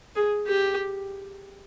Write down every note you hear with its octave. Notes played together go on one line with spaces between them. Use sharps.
G#4
G4